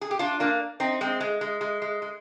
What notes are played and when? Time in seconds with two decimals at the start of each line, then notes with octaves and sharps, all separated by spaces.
0.01 G#4
0.11 G4
0.19 D4 F4
0.40 A#3 D4
0.80 C4 D#4
1.01 G#3 C4
1.20 G#3
1.41 G#3
1.61 G#3
1.82 G#3
2.02 G#3